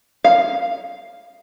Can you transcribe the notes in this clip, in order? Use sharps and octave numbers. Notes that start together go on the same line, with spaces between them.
F5